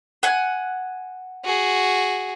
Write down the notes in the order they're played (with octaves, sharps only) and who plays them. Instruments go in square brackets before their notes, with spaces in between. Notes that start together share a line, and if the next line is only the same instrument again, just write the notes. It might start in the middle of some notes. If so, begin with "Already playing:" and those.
[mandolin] F#5 G#5
[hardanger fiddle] F#4 G#4